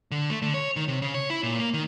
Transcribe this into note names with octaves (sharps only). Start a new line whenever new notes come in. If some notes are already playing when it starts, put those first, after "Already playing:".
D3
A3
D3
C#5
D#3
C3
C#3
C#5
E4
A#2
A#3
D#3